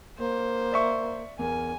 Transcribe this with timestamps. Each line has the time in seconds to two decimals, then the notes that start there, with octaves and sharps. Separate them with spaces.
0.19 A#3 C5
0.72 D5 E5 C#6
1.39 E2 A#4 G#5